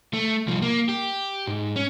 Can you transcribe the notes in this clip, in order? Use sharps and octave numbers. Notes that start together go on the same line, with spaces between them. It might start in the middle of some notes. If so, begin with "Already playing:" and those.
A3
C2 F3
A#3
G4
G#2
C#4